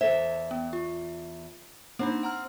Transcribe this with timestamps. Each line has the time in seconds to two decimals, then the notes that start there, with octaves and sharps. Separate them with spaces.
0.01 E2 A4 C5 E5
0.51 B3
0.73 F4
1.99 A#3 C4 D4 D#4
2.23 F#5 A#5 F6